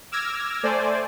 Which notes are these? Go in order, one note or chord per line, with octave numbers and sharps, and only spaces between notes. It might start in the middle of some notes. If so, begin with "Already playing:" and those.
D6 E6 F6 G#6 A#6
A3 C5 D5 G#5